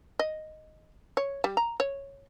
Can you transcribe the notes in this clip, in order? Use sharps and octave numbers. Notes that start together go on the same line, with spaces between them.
D#5
C#5
G3
A#5
C#5